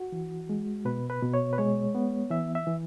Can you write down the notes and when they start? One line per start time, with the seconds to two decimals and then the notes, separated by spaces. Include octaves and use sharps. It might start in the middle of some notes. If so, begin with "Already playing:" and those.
Already playing: F#4
0.12 E3
0.49 G#3
0.85 B2 B4
1.10 B4
1.22 B2
1.34 C#5
1.53 B4
1.58 G#3 C#5
1.95 B3
2.31 E3 E5
2.55 E5
2.67 E3